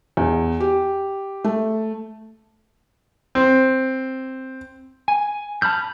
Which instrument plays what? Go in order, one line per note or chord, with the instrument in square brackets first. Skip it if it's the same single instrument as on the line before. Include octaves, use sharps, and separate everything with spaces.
[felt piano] E2
G4
A3
[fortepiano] C4
[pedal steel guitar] G#5
A5 B5 F6 G6